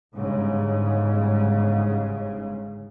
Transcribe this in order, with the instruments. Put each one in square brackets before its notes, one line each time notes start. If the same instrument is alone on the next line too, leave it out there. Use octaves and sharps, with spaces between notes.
[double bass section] G1 G#2 C#3